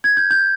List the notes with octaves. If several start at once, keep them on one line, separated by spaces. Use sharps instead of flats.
G#6
G6
G6